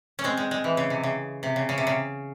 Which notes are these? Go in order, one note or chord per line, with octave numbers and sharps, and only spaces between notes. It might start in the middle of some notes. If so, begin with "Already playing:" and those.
C#4
G#3 C4
G#3
G#3
E3
C#3
C3
C#3
C3
C#3
C#3
C3
C#3